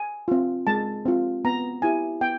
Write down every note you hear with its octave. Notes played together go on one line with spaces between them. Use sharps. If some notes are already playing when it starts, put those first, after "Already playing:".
Already playing: G#5
C4 F4
G#3 A5
C4 F4
B3 A#5
E4 G4 G#5
B3 G5